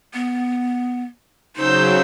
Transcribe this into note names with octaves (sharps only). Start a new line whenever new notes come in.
B3
C#3 F#3 D#4 C5 E6 G6